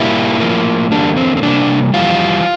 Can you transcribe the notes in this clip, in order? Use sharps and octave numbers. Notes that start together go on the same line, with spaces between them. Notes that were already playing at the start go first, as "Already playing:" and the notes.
Already playing: A#2 G3 A#3 E4
A2 F3 A#3
E2 D3 G3 A#3 D4
C4
C4
C3 G3 A#3 D4
F2 E3 G3 F4